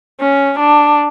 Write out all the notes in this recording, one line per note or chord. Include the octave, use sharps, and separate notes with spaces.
C#4
D4